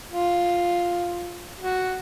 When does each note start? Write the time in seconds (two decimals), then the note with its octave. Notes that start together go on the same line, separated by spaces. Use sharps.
0.10 F4
1.60 F#4